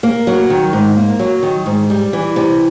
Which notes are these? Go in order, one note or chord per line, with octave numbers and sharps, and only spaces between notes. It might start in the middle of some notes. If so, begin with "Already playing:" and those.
A#3
F#3
D#3
G#2
A#3
F#3
D#3
G#2
G3
E3
C3